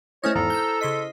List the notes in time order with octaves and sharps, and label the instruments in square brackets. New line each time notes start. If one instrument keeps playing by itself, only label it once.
[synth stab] A3 C#4 D#5 [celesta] E4 C5 F6 [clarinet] C#5
[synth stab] E2 G#2 [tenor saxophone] A4 [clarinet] A#5
[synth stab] E6 G6
[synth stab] C#3 C6 B6 [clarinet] D#5